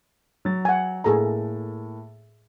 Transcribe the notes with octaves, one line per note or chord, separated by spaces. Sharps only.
F#3 A6
F#5 G#5
A2 A#3 G#4 A4 A#5